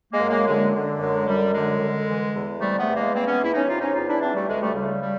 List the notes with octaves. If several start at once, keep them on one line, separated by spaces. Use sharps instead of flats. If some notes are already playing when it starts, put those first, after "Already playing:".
G#3 A#3
F#2
G#3 A#3
D3 G#3
D3
F#2 G#3
F#2 G3
D3 G#3
D3
E3
E2
C3 G3 A3
A3 B3
E2
G#3 A#3
E3 A#3 C4
B3 C#4
E2 E4
C#4 D#4
C3 D#4 F4
C#4 D#4
E2 D#4 F4
D4 E4
E3 C4 D4
G3 A3
D2 G#3
G3 A3
C#3 G3
G3